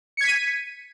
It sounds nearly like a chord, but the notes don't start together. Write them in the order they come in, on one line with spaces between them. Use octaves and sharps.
C#7 G#6 B6 D#7